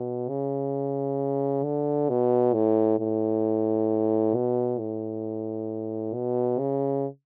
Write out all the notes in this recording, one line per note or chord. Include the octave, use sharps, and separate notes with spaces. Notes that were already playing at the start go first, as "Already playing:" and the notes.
Already playing: B2
C#3
D3
B2
A2
A2
B2
A2
B2
C#3